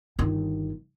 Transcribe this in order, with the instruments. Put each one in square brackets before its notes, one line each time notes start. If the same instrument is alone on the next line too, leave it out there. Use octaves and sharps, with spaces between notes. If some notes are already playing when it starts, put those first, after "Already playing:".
[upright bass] G1 D#3